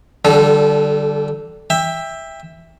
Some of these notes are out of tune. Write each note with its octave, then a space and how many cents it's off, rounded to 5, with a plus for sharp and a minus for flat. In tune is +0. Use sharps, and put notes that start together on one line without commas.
D3 +0 G3 -25 A4 -30
E5 +0 G5 +25